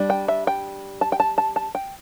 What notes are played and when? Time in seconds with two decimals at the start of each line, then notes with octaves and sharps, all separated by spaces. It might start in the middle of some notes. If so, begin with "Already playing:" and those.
Already playing: G3 D4
0.10 G5
0.28 E5
0.47 G5
1.01 A5
1.12 G5
1.20 A5
1.38 A5
1.56 A5
1.75 G5